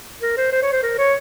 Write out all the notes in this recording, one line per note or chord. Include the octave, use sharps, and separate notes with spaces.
A#4
C5
C5
C#5
C5
A#4
C#5